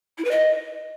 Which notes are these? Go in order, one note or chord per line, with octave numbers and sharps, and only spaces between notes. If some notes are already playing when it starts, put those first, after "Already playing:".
E4
B4
D#5